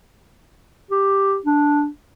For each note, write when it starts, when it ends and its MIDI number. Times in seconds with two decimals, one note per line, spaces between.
0.91 1.38 67
1.46 1.88 62